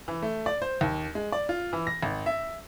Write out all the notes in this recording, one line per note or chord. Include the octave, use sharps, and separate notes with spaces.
E3
A3
D5
C5
D#2
G#3
D5
F4
E3
A#6
G#1
E5